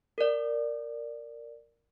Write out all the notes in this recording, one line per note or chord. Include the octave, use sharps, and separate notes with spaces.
A#4 D5